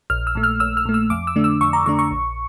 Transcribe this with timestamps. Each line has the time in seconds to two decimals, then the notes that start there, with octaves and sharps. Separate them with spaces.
0.10 A#1 F6
0.27 E6
0.35 A#2 A3
0.43 F6
0.60 A#1 E6
0.77 F6
0.85 A#2 A3
0.94 E6
1.10 F2 D6
1.27 E6
1.36 D3 A3 D4
1.44 E6
1.61 F2 C#6
1.73 A#5
1.86 D3 A3 D4 C#6
1.99 C#6
2.11 A#1